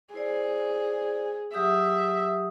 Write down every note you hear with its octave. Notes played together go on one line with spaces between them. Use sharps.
E4 G#4 C5 D5
F#3 G4 E5 D#6